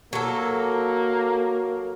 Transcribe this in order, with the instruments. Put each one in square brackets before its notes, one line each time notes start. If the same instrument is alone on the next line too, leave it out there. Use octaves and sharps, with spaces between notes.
[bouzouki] F#3 A4 [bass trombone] A#3